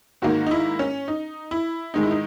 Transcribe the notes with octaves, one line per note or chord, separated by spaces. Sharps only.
G#2 D#3 A#3 F#4
D#4
E4
C#4
D#4
E4
G#2 D#3 G#3 D#4
E4
D#4